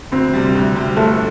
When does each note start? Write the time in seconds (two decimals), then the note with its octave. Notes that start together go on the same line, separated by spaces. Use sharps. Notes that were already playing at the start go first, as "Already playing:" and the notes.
0.12 D2 C4
0.34 C3 G3
0.55 D2
0.75 C3 G3
0.96 G1 A3